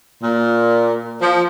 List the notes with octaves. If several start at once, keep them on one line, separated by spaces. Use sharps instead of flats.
A#2
F3